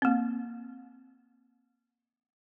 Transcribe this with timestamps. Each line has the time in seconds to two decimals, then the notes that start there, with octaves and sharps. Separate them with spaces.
0.02 A#3 C4